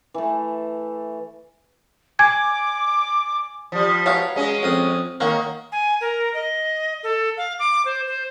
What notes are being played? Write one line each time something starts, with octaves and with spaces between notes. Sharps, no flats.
E3 A3
G#5 D6 G#6
F3 G3
F#3 B4 C#5 F5
G#3 C#4
F2 D#6
D#3 A#3 C#5 F5 F#5
G#5
A#4
D#5
A4
F5
D6
C5
C5